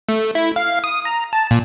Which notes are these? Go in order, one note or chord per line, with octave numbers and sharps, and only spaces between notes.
A3
E4
F5
D#6
A#5
A5
A#2